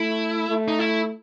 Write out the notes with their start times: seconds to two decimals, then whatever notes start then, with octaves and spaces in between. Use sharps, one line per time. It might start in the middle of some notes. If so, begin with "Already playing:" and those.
Already playing: A3 E4
0.49 A3
0.68 D#4
0.79 E4